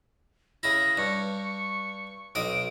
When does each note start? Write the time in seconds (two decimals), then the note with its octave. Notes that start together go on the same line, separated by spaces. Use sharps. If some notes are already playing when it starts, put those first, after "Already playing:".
0.63 C#3 E4 A#6
0.98 G2 C#6
2.35 B1 C4 D#5 D7